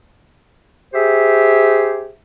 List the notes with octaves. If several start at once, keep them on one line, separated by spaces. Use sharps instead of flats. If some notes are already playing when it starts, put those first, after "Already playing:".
G4 G#4 C5 E5